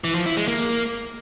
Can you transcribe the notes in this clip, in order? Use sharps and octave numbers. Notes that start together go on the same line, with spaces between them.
E3
F3
E4
G#3
A#3